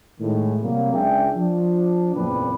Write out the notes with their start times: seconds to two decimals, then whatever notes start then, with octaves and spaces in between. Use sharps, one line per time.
0.20 A2 D#3 G#3
0.62 C3 F#3 G3 A#3
0.93 C#2 D4 G#4 E5 G5
1.36 F3 D4
2.15 F#1 E2 A#2 C4 B4 D5